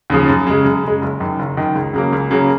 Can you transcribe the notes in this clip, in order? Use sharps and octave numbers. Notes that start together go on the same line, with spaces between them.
D#2 C#3 F3
F#2
C#3 G#3
F#2
C#3 G#3
F#1
F#2 D#3
F#1
F#2 D#3
C#2
C#3 F#3 A#3
C#2
C#3 F#3 A#3